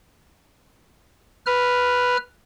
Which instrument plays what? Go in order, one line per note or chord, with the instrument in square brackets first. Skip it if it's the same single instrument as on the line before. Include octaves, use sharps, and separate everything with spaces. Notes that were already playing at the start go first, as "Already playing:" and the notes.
[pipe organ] B4 F6